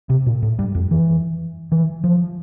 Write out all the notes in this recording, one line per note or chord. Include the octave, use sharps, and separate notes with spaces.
C3
A#2
A2
G2
F2
E3
E3
F3